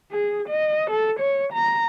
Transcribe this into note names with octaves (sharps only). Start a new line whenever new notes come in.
G#4
D#5
A4
C#5
A#5